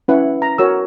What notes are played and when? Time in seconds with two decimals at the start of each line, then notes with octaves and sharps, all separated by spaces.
0.08 C#4 E4 B4 F#5
0.42 A#5
0.58 F#4 A#4 C#5 E6